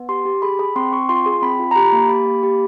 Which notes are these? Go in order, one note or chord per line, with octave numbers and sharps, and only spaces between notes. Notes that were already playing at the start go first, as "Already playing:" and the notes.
Already playing: B3
G4 C6
G4
G#4 B5
G#4 B5
C4 C6
C4 C#6
F4 C6
G#4
C4 B5
F4
A#5
G4 B5
A#3
G4 B5
A#3
G4